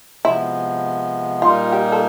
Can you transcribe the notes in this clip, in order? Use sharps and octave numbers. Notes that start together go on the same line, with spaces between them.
C3 F3 G#3 B3 E4
A#2 G3 A#3 D#4 F4
G4
A4